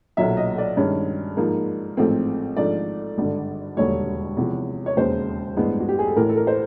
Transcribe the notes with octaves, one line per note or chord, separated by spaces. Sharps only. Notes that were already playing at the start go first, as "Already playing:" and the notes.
B1 A#2 F#3 E5
D#5
D5
G2 D#3 G#3 C#4
G#2 F3 A#3 D#4
A1 G#2 F3 A3 C4
G#2 F3 A3 D4 D5
G#1 G2 D3
E1 D#2 D3 G3 C#5
E2 C3 F3
C#5
E1 D#2 C#3 C5
A1 G2 E3 G#3 B3
F#4
G4
G#4
A4
A1 A2 E3 A#4
A4
A#4
C5